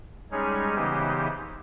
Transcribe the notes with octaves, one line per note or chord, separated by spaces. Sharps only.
G3 G#3 C#4 D#4 G#4 C#5
C#3 E3 B3 D#4 G4 C5